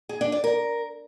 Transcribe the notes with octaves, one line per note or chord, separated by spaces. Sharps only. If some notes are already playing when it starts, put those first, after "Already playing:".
G#4
D4
D5
A#4